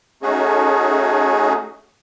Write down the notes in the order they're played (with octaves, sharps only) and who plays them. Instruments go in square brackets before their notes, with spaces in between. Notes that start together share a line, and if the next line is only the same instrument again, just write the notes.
[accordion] A3 C#4 D#4 F#4 G#4